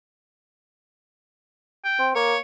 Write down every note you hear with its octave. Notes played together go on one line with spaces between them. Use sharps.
G5
C4
A#3 C#5